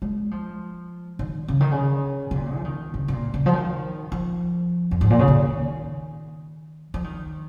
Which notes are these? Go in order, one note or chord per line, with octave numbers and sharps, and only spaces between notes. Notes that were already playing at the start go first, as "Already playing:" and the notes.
G#3
F3
D#3
C#3
D#3
C#3
C#3
A#2
F3
D#3
C#3
C#3
A#2
C#3
F3
D#3
F3
F2
G#2
A#2
C#3
D#3
F3
D#3